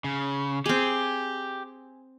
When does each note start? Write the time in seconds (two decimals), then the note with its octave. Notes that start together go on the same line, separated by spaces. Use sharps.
0.04 C#3
0.66 C4 G4 G#4